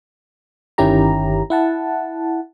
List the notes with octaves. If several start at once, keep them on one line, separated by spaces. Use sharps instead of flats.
G1 D#3 C#4 E4 G4 A#5
E4 F#5 A5